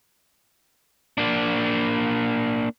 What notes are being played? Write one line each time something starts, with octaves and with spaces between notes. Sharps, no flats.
A#3 D4